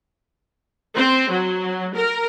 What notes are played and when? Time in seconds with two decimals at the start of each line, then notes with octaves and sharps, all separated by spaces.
0.95 C4
1.30 F#3
1.94 A#4